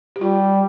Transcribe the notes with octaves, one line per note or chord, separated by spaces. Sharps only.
G4
G3 F4